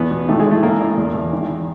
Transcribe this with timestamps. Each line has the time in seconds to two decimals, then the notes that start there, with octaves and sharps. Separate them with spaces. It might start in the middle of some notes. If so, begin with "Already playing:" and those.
Already playing: E2 B3
0.11 B2
0.28 G#1 A3
0.39 G#3
0.46 G#1
0.51 A3
0.63 A1 A#3
0.81 A1
0.97 E2
1.15 E2
1.32 G#1